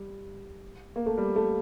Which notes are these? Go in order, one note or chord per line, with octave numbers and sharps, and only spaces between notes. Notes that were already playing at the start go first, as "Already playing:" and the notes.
Already playing: G3
A#3
A3
G3
A3